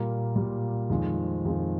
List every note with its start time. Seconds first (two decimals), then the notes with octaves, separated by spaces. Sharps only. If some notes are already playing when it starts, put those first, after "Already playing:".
Already playing: A#2 G3 A#3 F4
0.35 A#2 G3 A#3 F4
0.90 F2 D#3 G#3 C4 F4
1.45 F2 D#3 G#3 C4 F4